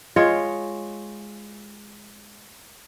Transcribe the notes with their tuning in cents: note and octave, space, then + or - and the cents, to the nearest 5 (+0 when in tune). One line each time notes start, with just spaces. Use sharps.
G#3 +0 F4 +0 C#5 +0